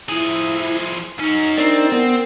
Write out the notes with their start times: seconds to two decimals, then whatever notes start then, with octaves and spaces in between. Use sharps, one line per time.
0.09 F3 E4 G#4
1.19 F#3 C#4 D#4
1.57 C4 D4 A#4 D5
1.92 B3 A#4